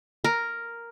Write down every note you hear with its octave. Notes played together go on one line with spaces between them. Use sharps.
A#4